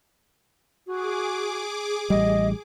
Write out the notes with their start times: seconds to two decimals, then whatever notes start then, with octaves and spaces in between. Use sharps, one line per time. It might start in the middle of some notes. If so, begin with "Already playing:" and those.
0.87 F#4 G#4 D6
2.10 A1 G3 D#5